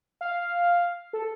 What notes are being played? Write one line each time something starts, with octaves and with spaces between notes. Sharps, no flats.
F5
A4